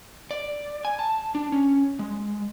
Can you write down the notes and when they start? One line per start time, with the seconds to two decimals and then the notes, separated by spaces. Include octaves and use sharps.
0.31 D5
0.85 G#5
0.99 A5
1.35 D4
1.52 C#4
1.99 G#3